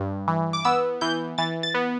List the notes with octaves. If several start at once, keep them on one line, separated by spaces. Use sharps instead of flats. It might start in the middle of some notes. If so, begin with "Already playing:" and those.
Already playing: G2
E3
D6
B3 E6
E3 G6
E3 A6
A6
B3